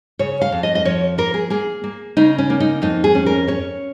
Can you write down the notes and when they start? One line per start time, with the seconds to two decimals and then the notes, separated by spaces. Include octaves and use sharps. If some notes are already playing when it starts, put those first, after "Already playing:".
0.19 C#3 C#5
0.41 F5
0.52 F2
0.63 D#5
0.75 D#5
0.85 F3 C#5
1.18 A#3 A#4
1.34 G#4
1.50 A#3 G#4
1.84 A#3
2.17 C#3 D#4
2.38 C#4
2.50 A#3
2.60 D#4
2.82 F2 D#4
3.04 G#4
3.15 C#4
3.26 A#4
3.48 C#4 C#5